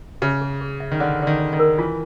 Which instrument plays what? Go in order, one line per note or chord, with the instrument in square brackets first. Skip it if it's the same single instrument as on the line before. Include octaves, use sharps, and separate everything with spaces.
[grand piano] C#3 [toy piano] E5
[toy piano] G#4
G#4
E5
[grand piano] D#3
[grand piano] D3 [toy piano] D5
[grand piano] D3 [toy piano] D5
[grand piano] D#3
[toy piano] D5
[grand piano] D#3
[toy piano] A#4
[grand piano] E3 [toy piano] F4